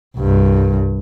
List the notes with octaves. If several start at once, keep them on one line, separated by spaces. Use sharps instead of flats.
C2 G2